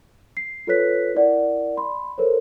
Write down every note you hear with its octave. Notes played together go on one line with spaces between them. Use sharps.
C7
F4 A4 B4 C#5 F#6 B6
E4 A#4 D5 F#5
B5 C6
A4 A#4 C5 C#5